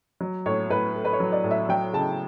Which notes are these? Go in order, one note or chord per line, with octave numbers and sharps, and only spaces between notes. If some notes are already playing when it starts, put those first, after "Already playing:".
F#3
A2 C#5
A2 B4
A3
B4
C#5
F#3
D5
A2
E5
F#3 G5
C#3 A5